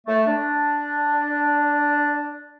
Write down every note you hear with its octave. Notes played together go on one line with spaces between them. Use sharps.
A3
D4